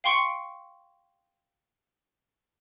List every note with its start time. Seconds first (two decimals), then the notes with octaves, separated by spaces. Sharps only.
0.04 F5 G5 C6 C#6 C#7 D7